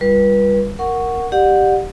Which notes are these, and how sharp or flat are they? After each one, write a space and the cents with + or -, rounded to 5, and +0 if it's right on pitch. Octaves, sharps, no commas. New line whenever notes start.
G3 +15 F4 +0 B4 -30
A#4 +0 F#5 +0 C#6 +0
G4 +0 D5 +30 F#5 -20